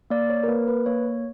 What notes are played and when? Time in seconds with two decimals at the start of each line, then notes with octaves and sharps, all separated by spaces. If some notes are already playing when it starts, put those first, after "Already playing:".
0.10 A#3 D5
0.29 C#5
0.43 A#4
0.48 A#3 B4
0.68 B4
0.86 A#3 C#5